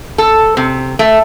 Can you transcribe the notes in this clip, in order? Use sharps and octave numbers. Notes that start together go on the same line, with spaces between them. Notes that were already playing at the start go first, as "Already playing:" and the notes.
A4
C3
A3